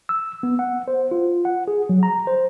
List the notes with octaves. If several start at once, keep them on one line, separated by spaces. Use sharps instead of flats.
E6
B3
F#5
C5
F4
F#5
G#4
F#3
A#5
C5